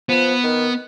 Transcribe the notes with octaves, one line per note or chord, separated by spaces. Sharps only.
F3 B3
D#3